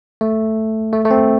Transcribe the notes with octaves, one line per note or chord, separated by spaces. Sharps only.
A3
A3
A3
C4